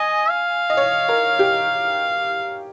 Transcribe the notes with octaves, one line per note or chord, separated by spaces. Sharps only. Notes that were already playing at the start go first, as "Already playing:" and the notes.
Already playing: D#5 G#5
F5
D#5
C#5
A#4
G4